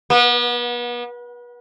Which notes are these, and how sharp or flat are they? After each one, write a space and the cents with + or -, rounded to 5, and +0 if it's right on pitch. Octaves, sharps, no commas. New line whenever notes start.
B3 -35